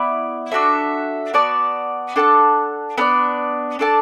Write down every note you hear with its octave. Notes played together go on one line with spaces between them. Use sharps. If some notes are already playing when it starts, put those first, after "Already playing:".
Already playing: B3 E4 D5
D4 F#4 A4 E5
B3 F#4 D5 A5
D4 A4 F#5 A5
B3 D4 A4 D5
D4 A4 D5 A5